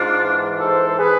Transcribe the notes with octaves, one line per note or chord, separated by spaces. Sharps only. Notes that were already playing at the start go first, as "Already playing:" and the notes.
Already playing: G#2 D4 F4
E3
G#2 A4 C5
C5
G#4 B4